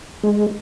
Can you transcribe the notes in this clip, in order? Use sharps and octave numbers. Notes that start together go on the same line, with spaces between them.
G#3